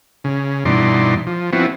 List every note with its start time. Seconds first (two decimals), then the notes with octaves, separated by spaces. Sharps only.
0.24 C#3
0.65 G2 B2 E3 D#4 D5 C6
1.27 F3
1.53 F3 B3 C4 E4 F#4